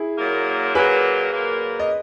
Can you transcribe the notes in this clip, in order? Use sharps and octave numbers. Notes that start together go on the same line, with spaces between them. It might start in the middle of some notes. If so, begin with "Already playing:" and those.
Already playing: E4 G#4
A#2 F#3 A#3
A#2 F#3 A#3 G#4 B4
A#2 F#3 A#3
D#5